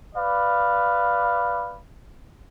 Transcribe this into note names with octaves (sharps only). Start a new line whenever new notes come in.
B4 D5 F5